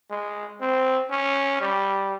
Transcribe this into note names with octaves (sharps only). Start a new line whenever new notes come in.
G#3
C4
C#4
G3